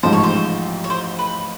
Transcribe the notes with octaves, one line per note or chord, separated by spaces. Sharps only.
A1 G#2 F3 C5
C#5
C5
C#5
C5
B4